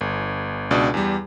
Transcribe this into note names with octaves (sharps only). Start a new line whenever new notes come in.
G1
C#2 B2 D4
E2 G3